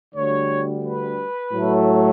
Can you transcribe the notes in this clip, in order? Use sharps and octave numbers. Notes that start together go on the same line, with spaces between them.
D2 D3 G3 C#5
B4
A2 F#3 A3